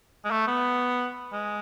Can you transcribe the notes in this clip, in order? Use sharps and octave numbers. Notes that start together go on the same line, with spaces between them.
G#3
A3
B3
G#3